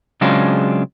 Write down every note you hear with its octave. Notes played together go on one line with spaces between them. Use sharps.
C#3 F#3 G#3 C4 D4 F4